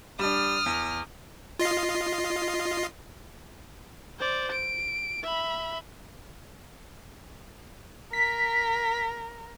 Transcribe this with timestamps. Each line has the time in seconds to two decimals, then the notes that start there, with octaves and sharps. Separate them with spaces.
0.19 G3 D4 D#6 F6
0.66 E2
1.59 F4 D#5 C7
4.19 C5 D5
4.52 D7
5.23 E5 B5
8.13 A#4 B6